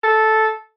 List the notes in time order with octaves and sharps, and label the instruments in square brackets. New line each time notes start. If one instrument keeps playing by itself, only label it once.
[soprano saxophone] A4